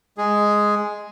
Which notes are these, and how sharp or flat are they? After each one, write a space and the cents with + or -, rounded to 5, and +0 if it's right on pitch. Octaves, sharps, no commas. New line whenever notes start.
G#3 +0 G#4 +0